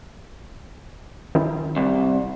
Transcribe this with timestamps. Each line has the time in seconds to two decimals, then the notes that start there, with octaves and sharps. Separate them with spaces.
1.35 D#3 C#4 E4
1.76 C2